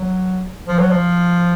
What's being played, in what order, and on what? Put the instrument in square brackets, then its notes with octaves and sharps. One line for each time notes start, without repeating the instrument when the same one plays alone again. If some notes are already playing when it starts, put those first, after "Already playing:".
Already playing: [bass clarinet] F#3
F3
F#3
F3